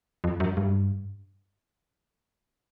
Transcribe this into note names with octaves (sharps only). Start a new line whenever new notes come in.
F2
F#2
G2